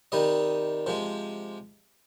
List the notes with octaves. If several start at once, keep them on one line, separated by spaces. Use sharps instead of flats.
C3 D#3 G3 D#5
C3 F3 G#3